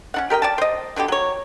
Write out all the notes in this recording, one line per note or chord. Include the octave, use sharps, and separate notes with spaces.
C#4 D4 F#5
G4 A#4 D#5 G5
D5 G5 A5
C5 D#5
B2 D3 G3 G4
F#3 C#5